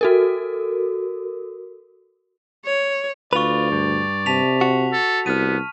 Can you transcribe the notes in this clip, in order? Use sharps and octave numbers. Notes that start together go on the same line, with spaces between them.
F#4 A4 A#4
C#5
D2 F4 B4 D5 C#6 F7
G2
C3 A5 B6 F7
F#4
A4
C2 B3 F6 D#7